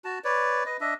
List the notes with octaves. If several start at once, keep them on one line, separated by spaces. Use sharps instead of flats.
F#4 A5
B4 C#5 D5
B4 D#5
D4 D#5 E5